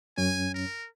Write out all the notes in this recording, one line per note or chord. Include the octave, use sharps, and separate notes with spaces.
F#2 C#4 G#5
A#4